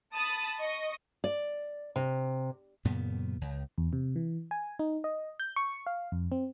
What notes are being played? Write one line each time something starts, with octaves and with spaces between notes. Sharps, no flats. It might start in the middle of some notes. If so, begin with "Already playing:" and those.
A5 B5 D#6 A6
D#5 C#6
D5
C3
F#2 A#2 C#3 B3
C#2
E2
C3
E3
G#5
D#4
D#5
G6
C#6
F5
F2
C4